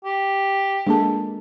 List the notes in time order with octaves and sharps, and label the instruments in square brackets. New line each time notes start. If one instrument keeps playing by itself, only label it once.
[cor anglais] G4
[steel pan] G#3 A#3 A4 [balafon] D4 A5